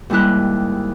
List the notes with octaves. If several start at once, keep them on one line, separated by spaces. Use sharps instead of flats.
D#2 G#2 G3 E4 F#6